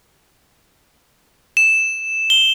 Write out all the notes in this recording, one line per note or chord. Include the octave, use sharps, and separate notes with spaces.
E7
G7